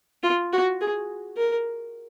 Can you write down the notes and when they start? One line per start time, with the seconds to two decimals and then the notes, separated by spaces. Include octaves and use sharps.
0.23 F4
0.53 F#4
0.81 G#4
1.37 A#4